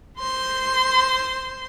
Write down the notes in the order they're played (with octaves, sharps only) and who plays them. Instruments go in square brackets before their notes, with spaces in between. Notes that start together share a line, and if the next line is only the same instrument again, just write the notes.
[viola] C5 C6